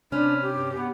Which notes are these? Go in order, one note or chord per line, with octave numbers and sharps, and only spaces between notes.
C3 C#4 D4 B4 C5 F6
G4
G2
B3